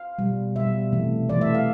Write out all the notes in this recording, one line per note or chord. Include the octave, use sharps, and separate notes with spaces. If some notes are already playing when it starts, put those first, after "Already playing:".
Already playing: F5
B2 G3
B2 G3 E5
C3 E3 A3
C3 E3 A3 D5
E5
F5